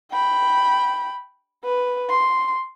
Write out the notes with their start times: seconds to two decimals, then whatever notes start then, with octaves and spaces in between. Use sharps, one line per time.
0.12 G5 B5
1.65 B4
2.10 C6